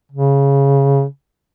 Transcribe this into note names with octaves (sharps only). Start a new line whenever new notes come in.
C#3